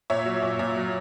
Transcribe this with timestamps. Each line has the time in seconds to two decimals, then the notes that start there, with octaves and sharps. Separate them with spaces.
0.10 A#2 C#5 E5
0.25 F#3
0.42 A#2
0.59 A#2
0.76 F#3